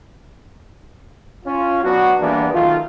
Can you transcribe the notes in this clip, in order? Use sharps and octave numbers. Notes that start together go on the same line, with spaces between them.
C#4 F4
F#3 B3 D4 F#4
E2 E3 G3 A#3 B3 D4
B1 D#3 A3 F4